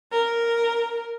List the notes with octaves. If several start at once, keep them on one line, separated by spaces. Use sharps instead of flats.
A#4